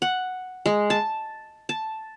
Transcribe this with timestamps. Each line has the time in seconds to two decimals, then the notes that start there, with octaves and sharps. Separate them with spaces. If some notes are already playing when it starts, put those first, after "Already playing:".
0.02 F#5
0.66 G#3
0.90 A5
1.69 A5